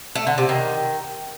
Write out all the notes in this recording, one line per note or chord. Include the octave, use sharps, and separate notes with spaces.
A3
D3
C3
D#3